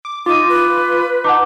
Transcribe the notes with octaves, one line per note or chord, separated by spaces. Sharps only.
D6
D#4 F4 D6 D#7
B4
D#4 F#5 A5 D6